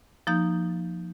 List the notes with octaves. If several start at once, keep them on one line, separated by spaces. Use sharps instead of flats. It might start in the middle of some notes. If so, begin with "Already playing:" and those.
F3 A#3 D#4 G6